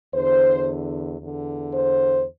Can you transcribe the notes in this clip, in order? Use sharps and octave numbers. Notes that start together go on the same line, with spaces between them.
E2 D3 C5
E2 D3
C5